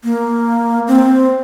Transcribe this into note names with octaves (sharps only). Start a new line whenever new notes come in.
A#3
C4